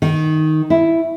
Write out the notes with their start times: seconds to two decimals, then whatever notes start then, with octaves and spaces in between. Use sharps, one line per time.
0.02 D#3
0.70 E4